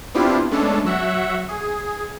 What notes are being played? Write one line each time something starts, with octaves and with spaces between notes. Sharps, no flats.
B3 C4 D4 E4 F4 G4
G#3 A3 B3 C#4 D4 A4
F#3 F#4 E5 F#5
G#4